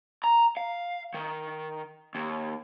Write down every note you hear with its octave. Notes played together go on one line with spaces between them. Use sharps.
A#5
F5
D#3
D#2